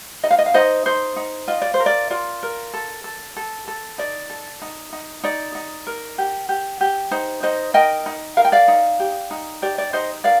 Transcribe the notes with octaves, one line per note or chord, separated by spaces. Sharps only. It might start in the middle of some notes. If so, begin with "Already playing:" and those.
D#4 D#5
F5
D#5
F5
D#4 C5 D#5
D#4 C5
D#4
F4 D#5
D5
C5
A#4
D5
F4 D5
A#4
A4
A4
A4
A4
D#4 D5
A4
D#4
D#4
D#4 D5
D#4
A#4
G4
G4
G4
D#4 C5
D#4 C5 D#5
A#4 D#5 G5
D#4
A#4 F5
G5
D5 F5
D#4
G4
D#4
G4 D5
D5
D#4 C5 D#5
A#4 D5 F5